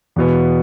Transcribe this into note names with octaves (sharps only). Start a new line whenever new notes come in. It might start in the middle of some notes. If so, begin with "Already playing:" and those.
E2 B2 B3